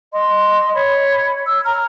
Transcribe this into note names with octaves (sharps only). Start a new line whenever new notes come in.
D#5 C6
C#5 B5
E6
A#5 F6